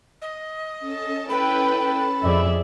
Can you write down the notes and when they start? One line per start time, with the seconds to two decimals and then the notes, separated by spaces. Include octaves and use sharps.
0.22 D#5
0.80 C#4 A4 A5
1.29 E4 B4 G5 B5
2.23 F2 G#4 D5 E5